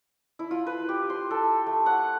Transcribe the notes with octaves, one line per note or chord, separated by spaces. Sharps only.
E4
F4
B4
G4
C6
A4
A3
F#5